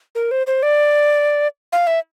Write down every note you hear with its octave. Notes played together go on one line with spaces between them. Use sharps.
A#4
C5
C5
D5
F5
E5